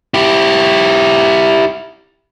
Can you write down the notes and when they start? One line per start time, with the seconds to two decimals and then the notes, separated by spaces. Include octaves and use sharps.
0.14 E4 G4